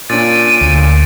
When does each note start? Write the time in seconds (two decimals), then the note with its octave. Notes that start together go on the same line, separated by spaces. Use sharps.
0.10 A#2 C#4 D4 A6 D7 D#7
0.61 D2